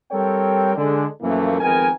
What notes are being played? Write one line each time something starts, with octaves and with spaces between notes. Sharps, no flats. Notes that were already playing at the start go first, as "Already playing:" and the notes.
G3 C4 A4 A#4 C#5 G5
D3 G#3 D4 A4
F#2 B2 E3 F3 A3 A#3
F2 D#3 G#3 B3 A#4 G#5